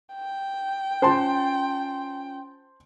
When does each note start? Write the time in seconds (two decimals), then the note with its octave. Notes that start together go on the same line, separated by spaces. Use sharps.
0.15 G5
1.02 C#4 F4 C5 A5 C6